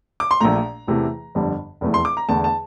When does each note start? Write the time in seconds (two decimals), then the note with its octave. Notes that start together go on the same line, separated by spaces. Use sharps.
0.20 D6
0.31 C6
0.41 A#1 A#2 A3 A#5
0.88 E2 C3 E3 A3
1.35 G1 F2 D3 G3
1.81 F1 E2 E3 A3
1.94 C6
2.05 D6
2.17 A#5
2.28 E2 D3 A3 A5
2.44 A5